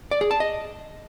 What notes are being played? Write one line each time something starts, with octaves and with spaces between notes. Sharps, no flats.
D5
G#4
A5
D#5